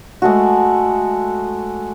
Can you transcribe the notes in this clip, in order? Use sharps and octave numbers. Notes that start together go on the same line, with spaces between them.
G#3 A3 F#4